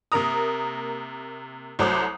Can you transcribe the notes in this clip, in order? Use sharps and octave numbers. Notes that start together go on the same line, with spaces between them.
C3 A#3 A#4 A#5 D#6
C2 F#3 A3 C5 D6 D#6